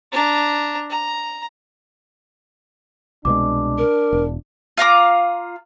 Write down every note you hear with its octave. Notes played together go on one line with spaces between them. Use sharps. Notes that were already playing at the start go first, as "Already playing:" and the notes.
D4 A#5
A#5
C2 B2 G#3 D4 D6
A#4
E1
F4 F5 A#5 D6